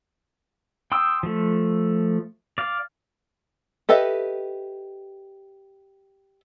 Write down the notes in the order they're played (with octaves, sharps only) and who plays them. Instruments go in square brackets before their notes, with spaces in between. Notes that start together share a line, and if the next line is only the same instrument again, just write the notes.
[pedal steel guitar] G5 C6 D#6 E6
F3 A3
D5 F5
[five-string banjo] G4 A4 B4 D#5 E5